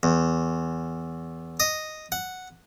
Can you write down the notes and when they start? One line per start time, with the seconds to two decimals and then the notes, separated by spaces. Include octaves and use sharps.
0.03 E2
1.60 D#5
2.12 F#5